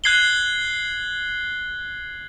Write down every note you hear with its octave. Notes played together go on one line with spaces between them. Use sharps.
F#6 G#6 C7 F#7 G7